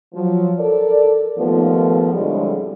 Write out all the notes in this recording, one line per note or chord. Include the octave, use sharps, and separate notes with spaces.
F3 F#3
A4 A#4 D5
D#2 G#2 D#3 F3 A3 B3
F2 A2 D3 G3 G#3 G#4